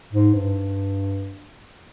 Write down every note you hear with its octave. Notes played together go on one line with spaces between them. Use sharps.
G#2
G2